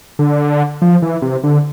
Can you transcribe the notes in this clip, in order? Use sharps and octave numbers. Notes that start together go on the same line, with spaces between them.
D3
F3
E3
C3
D3